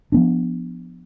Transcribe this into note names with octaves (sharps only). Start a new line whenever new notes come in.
F3 B3 D4